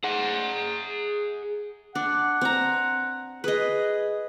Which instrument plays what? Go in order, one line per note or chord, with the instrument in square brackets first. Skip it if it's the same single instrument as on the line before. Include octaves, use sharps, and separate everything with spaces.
[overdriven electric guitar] G#4 F#5
[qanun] D4 [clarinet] F#5
[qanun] C4 A#5
[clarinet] G#4 [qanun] B4 D#5